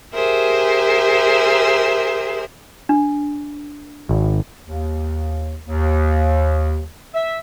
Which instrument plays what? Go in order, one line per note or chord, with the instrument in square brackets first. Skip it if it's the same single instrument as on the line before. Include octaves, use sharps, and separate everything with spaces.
[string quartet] G4 G#4 A#4 C5 E5
[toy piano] D4
[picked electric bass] G#1
[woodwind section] D#2
D#2
E5